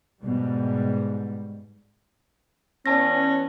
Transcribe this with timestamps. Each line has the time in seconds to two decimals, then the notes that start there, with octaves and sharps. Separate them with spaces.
0.21 G#2 B2 G3
2.86 E3 B3 C#4 D5 A5 A#6